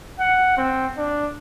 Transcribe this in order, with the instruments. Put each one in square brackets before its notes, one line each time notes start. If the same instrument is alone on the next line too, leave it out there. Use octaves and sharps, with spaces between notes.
[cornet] F#5
C4
D4